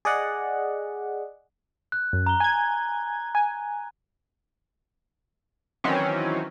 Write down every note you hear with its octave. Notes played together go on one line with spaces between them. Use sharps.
G#4 D5 D#5 F#5
F#6
F#2
A#5 G7
G#5 G#6
G#5
D#3 E3 F#3 C4 C#4